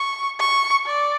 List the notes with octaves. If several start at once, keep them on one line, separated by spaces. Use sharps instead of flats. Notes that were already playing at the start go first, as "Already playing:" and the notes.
Already playing: C#6
C#6
D5